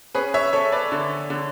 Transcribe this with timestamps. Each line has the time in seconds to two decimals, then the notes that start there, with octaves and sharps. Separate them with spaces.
0.15 C#4 G#4 B4
0.34 C#5 E5
0.53 C#4 A4 C#5
0.72 B4 D5
0.92 D3
1.30 D3